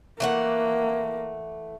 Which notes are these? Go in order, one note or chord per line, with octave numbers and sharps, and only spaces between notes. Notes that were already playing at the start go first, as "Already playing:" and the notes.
E3 A3 A#3 F#5